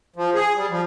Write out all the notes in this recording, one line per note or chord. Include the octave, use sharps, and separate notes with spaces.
F3
G#4
G3
F3